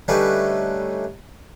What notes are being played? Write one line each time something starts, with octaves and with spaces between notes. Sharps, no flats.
D3 G3 A3 C#4 D#4 B4